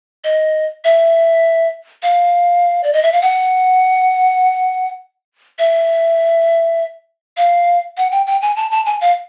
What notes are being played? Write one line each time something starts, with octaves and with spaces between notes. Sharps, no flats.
D#5
E5
F5
D5
D#5
E5
F5
F#5
E5
F5
F#5
G5
G5
G#5
A5
A5
G#5
F5